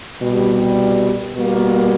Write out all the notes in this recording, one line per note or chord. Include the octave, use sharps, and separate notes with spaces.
C2 B2 G3
B2 G3 A#3